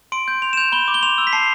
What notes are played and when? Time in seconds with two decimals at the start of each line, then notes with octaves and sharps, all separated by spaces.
0.12 C6 D7
0.28 G6
0.42 C6 F7
0.53 E7
0.57 G6 F7
0.72 B5 G7
0.88 D6
0.94 G7
1.03 C6 F7
1.18 E6
1.27 B6
1.33 A5 C7